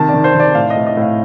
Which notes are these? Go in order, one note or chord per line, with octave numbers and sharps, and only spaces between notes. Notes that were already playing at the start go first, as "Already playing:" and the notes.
Already playing: C3 D#3 A5
D5
D#3
C5
D#3 D5
A2 F5
D#5
A2
D#5
A2 F5